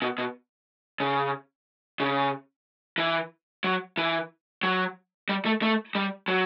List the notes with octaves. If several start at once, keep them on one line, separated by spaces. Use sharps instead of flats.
B2
B2
C#3
C#3
E3
F#3
E3
F#3
G3
A3
A3
G3
F#3